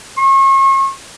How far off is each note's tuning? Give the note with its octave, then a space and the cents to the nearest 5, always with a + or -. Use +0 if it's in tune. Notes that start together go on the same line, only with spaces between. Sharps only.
C#6 -40